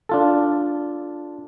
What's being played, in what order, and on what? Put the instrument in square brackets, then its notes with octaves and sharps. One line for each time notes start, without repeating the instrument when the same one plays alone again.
[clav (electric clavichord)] D4 F4 A4